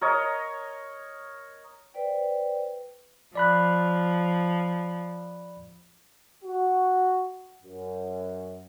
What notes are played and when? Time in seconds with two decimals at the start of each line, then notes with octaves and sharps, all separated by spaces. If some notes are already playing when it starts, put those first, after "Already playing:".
0.01 A#4 C#5 D#5 A#5
1.94 B4 C5 D5 G5
3.35 F3 D5 B5 F#6
6.44 F#4
7.63 F#2